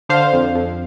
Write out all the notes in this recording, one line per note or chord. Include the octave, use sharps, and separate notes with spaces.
D3 C5 F5
F2
F2